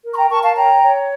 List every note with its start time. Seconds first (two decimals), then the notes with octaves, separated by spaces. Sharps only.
0.05 A#4
0.14 C#6
0.17 G5 A#5
0.31 A#4 A5 C#6
0.43 F5 A5
0.56 C#5 G5 A#5
0.82 C#5